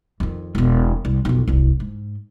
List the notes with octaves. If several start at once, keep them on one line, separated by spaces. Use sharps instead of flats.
F2 D#3
E1 B2
C2
B1 F2
D1 C2
G#2